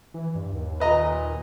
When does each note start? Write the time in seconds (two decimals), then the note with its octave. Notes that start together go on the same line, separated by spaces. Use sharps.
0.14 E3
0.35 G2
0.52 D#2
0.80 A#2 B4 D#5 A#5